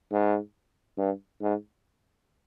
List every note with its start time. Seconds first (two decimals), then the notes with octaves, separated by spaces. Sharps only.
0.12 G#2
0.98 G2
1.41 G#2